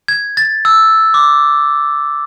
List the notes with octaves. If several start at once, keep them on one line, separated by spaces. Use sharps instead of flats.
G#6
A6
E6
D6